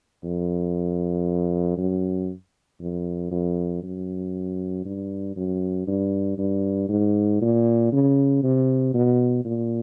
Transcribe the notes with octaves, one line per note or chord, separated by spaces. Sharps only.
F2
F#2
F2
F2
F#2
G2
F#2
G2
G2
G#2
A#2
C#3
C3
B2
A#2